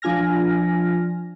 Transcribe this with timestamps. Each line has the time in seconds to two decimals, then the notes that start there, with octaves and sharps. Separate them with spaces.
0.02 F3 D4 F4 G#5 F6 A#6